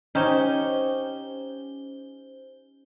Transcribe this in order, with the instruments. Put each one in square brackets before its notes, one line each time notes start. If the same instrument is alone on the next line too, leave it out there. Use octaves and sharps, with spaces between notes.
[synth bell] C#4 C5 G7 [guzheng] D#4 G4 C#5